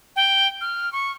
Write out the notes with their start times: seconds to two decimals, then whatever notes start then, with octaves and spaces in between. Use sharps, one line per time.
0.16 G5
0.61 F6
0.93 C#6